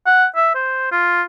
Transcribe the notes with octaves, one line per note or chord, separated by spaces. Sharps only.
F#5
E5
C5
F4